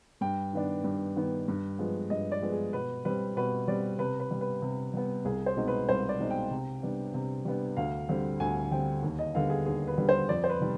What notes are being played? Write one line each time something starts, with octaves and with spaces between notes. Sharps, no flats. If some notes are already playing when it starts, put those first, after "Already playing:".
G2 G5
D#3 B3 D4
G2
D#3 B3 D4
G2
F3 G#3 B3
G2 D#5
D5
F3 G#3 B3
G#4
B2 B4
G3 C4 B4
B2 B4
G3 C4 D5
C3 B4
B4
G3 B3
B4
C3
G3 B3
C2 G#4
C5
B2 G#3 C4 D#4
B4
C2 C5
D5
B2 G#3 C4 D#4
G5
C3
G3 B3 D4
C3
G3 B3 D4
D2 F5
D3 G3 C4
D2 G#5
D3 G3 C4 G5
D#2
D#5
D3 G3 B3 F5
G#4
D#2 G#4
B4
D3 G3 B3
C5
F2 D5
C5
B4
C3 D#3 G3